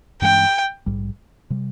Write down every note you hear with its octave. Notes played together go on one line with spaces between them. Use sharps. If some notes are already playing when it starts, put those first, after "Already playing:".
G2 E3 G#3 C#4 G5
A#1 G#2 G3
C3 G3